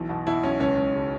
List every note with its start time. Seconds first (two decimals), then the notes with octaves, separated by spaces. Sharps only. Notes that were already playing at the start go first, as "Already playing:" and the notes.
Already playing: B1 E3
0.09 B2
0.27 B2 E4
0.43 B1 C#4
0.60 C#2 C#4
0.77 C#2
0.94 C#3